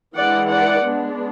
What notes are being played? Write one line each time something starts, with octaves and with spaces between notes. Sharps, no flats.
E3 G#3 D4 D5 F#5
D5 F#5
G#3 B3 D4